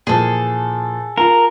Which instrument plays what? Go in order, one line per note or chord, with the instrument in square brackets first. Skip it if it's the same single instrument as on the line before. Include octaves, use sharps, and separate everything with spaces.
[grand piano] A#2 E3 F3 [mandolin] G#4 A4
[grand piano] F4 [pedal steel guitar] A#4